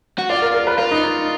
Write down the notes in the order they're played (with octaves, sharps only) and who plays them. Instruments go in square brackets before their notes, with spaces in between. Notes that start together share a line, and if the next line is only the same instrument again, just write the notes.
[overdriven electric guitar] F#4
[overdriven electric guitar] F4 [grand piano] D5
[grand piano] A#4
A#4
B4
[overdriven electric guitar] F4 [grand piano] B4
[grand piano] D#4
D#4